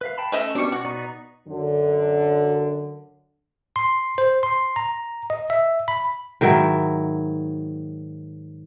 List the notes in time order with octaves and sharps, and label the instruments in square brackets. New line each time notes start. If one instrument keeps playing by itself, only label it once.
[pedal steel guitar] B4 E5 F5
G5 A5 B5
[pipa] A3 D#5 E5 [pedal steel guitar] C#4
[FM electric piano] B2 C#6 [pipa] G3 D4
[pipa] F#4
[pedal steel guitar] B3 D#4 D5
[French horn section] F#2 D3
[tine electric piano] C6
C5
C6
A#5
D#5
E5
B5
[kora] G#2 D#3 F#3 E4